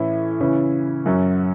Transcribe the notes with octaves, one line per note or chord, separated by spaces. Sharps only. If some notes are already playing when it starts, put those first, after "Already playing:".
Already playing: A2 E3 C#4 E4
C#3 E3 C#4 E4
F#2 F#3 C#4